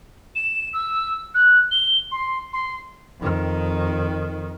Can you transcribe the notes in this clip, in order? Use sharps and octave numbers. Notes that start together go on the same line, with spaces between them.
E7
E6
F#6
G7
C6
C6
F2 D#3